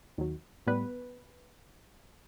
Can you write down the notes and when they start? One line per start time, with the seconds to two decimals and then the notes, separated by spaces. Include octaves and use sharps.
0.18 D#2 D#3 F#3
0.67 A2 G3 B3 B4